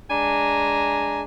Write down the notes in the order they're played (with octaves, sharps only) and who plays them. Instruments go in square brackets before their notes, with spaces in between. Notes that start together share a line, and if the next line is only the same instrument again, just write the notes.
[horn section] G#3 D4 G#5 A#5